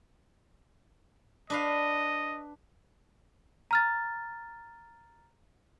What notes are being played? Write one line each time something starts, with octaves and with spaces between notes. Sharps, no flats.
D4 B4 D#5 F5
A#5 F6 A6